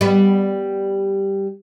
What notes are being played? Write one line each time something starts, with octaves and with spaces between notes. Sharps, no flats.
G3 B3